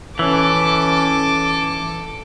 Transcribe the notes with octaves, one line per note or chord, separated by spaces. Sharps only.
E3 C#4 A4 D6